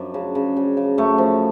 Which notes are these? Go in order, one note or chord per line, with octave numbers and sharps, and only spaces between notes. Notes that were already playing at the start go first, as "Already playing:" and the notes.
Already playing: F#2 F3 D4
C#3
C#3
C#3
C#3
F#2 A3
F3